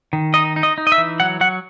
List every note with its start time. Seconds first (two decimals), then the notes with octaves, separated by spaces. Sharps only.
0.13 D#3
0.34 D#4 D#5
0.56 D#4
0.63 D#5
0.78 D#4
0.87 D#5
0.92 E5
0.98 E3
1.20 F#3 F#5
1.41 F#3 F#5